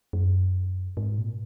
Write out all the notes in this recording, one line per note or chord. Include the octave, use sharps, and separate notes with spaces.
F#2
G#2
A#2